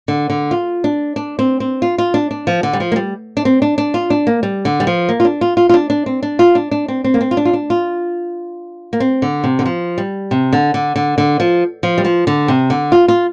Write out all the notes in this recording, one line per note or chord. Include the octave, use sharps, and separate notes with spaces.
D3
D3
F4
D4
D4
C4
C4
F4
F4
D4
D4
F3
D3
G3
F3
A#3
G3
D4
C4
D4
D4
F4
D4
A#3
G3
D3
G3
F3
A#3
F4
D4
F4
F4
F4
D4
D4
C4
D4
F4
D4
D4
C4
C4
A#3
C4
F4
D4
F4
D4
F4
A#3
C4
D3
C3
D3
F3
G3
C3
D3
D3
D3
D3
F3
F3
G3
F3
D3
C3
D3
F4
F4